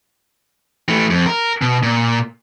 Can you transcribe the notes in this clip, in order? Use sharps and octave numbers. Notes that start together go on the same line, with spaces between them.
E3 A3
F2
A#4
B2
A#2